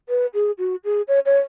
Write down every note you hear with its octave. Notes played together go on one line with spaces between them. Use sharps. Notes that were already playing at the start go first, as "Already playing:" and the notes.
B4
G#4
F#4
G#4
C#5
C#5